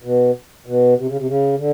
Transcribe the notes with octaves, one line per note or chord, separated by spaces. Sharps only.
B2
B2
C3
C#3
C3
C#3
D3